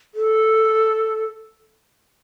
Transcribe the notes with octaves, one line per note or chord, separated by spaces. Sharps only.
A4